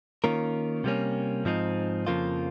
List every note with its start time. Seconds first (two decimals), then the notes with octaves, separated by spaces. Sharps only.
0.24 D#3 A#3 C#4 F4 A#4
0.84 C3 G3 A#3 C#4
1.45 G#2 F3 C4 D#4
2.07 F2 C#3 F3 A#3 F4